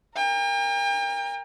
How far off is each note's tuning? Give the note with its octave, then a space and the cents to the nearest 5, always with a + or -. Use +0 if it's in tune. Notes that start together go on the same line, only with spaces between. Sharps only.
A#4 +0 G5 +40